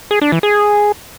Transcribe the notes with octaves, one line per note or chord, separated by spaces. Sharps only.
G#4
D4
E3
G#4